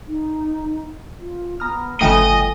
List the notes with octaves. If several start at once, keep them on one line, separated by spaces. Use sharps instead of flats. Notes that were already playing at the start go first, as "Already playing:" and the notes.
D#4
F4
B3 A#5 D#6 F6
G1 A2 C#3 F3 A3 D#5 G5 G#5